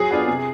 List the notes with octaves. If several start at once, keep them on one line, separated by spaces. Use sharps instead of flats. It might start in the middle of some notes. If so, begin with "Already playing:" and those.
Already playing: F#3 G#4
B3 D4 F4
C3